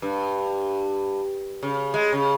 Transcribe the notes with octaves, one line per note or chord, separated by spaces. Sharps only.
G2
C#3
G#3
C#3